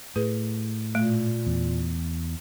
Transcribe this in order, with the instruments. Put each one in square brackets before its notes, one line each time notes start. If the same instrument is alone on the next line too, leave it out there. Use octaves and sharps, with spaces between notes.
[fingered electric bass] A2 [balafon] G#4 B4
[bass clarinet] A#2 [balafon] A3
[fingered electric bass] E2